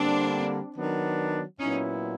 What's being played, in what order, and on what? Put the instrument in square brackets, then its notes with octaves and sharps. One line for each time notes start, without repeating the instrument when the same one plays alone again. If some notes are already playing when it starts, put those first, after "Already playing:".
Already playing: [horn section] D3 G3 A#3 [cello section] C4 D4
[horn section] D#3 F#3 B3 D4
[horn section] A#2 F#3 B3 E4 [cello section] C#4 D#4